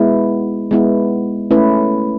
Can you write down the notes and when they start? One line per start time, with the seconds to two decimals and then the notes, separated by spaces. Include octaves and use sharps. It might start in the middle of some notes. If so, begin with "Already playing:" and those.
Already playing: G#3 B3 E4
0.71 G#3 B3 E4
1.51 A3 C#4 E4 B4